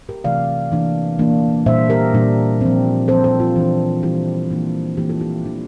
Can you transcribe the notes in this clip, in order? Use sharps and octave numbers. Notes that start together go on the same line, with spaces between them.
G4 A#4
C3 E3 A3 C4 D5 F5
E3 A#3 D4
E3 A#3 D4
A#2 G3 D4 C5 E5
G4 A#4
A#2 G3 D4
F3 C4
F3 C4 A4 C5
A4 C5
F4
E3 G3 D4
E3 G3 D4 E4 G4
E3 A#3 D4
E3 A#3 D4 E4 G4
F4 A4
E4 G4
E3 G3 D4